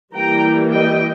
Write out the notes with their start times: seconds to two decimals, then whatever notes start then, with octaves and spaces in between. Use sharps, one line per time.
0.15 E3 G3 A#3 E4 G5 A#5
0.72 D#5 G5